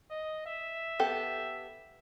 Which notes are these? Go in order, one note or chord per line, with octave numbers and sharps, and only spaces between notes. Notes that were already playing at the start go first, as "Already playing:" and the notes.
D#5
E5
B3 G4 A4